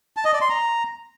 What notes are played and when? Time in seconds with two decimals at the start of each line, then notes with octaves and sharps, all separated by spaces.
0.17 A5
0.25 D#5
0.33 D5
0.41 C6
0.50 A#5